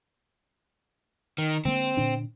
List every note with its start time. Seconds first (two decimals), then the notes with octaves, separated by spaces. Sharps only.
1.38 D#3
1.65 D3 G#3 A#3 C4
1.97 A#2 D3 D4